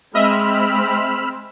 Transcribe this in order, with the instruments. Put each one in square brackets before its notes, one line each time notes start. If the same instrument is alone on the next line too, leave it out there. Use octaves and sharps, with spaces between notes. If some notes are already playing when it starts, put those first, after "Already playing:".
[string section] G#3 C4 [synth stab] D#5 E5 [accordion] B5 E6 F6